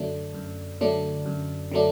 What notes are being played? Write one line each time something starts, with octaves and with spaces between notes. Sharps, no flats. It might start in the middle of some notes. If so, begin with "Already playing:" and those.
Already playing: F#2 D3 F#3 A3 D4
F#2
D3 F#3 A3 D4
F#2
D3 F#3 A3 D4